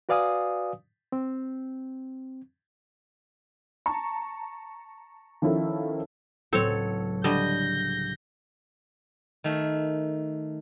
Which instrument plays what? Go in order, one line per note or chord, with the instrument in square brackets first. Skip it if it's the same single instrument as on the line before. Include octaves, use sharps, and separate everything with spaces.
[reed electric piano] F#4 B4 D5 F5 G#5 D#6
C4
[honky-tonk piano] A5 A#5 C#6
D#3 F3 C#4 E4 A4
[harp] C#2 A2 F#3 [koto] C4 [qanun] A4 C#5
[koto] D3 G3 D#5 [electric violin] G6 A#6
[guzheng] D#3 A3